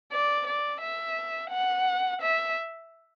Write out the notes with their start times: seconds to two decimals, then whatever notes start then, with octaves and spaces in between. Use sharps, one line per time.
0.12 D5
0.47 D5
0.81 E5
1.51 F#5
2.22 E5